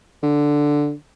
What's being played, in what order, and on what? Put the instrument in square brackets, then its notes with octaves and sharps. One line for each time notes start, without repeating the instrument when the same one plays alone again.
[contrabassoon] D3